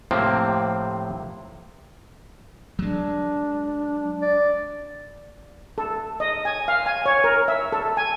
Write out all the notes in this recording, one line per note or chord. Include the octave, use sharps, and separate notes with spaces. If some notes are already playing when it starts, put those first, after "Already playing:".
A2 C3 F3 A#3 C4
F#3 G#3 D4
D5
A4
D#5
G#5
F5
G#5
C#5
A#4
E5
A4
G#5